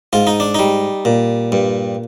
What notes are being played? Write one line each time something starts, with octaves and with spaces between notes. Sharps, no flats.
G#2 F4
D#4
D4
G3 D#4
A#2
G2